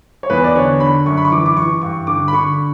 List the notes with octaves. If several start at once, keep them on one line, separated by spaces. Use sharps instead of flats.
C#5
E2 B4
D5
D3 C#5
D3 B5
F#2 C#6
B5
C#6
E3 D6
D6
E3 C#6
G2 C#6
D3 D6
B5
D3 C#6